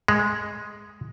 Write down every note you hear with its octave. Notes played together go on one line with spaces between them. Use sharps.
G#3